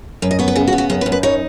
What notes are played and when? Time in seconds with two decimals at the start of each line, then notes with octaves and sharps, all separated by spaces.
0.22 F#2 B4
0.31 D#5
0.39 B3 C#5
0.48 B4
0.56 C#3 G#4
0.67 F#4
0.73 B3
0.78 F#4
0.90 F#2 G#4
1.01 B4
1.06 F#2
1.12 B4
1.23 D#4 C#5